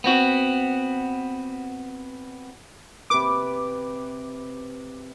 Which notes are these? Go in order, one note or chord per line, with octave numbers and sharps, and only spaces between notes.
B3 C4 F#4
C3 B4 D6